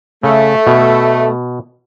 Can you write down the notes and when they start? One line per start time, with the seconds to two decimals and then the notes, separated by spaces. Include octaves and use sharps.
0.23 C#3 A3
0.67 B2